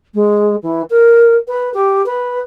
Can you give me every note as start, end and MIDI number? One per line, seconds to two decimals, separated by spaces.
0.14 0.55 56
0.62 0.81 52
0.89 1.34 70
1.47 1.71 71
1.73 2.04 67
2.05 2.39 71